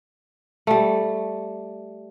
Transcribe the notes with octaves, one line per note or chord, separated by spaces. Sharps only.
G3 A3